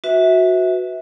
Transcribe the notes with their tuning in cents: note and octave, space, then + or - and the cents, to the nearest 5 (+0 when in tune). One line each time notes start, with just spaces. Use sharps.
F#4 -10 B4 +0 E5 -20